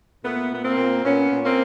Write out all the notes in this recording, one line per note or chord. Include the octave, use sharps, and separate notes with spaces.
A#2 A3 B3
A#2 B3
A#3 C4
A#2
A#2 B3 C#4
A#2
A#3 C4